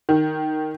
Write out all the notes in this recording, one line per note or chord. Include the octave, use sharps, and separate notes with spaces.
D#3